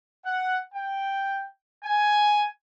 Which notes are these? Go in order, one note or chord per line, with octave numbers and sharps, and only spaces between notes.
F#5
G5
G#5